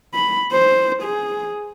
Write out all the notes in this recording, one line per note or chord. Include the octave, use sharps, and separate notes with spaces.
B5
C5
G#4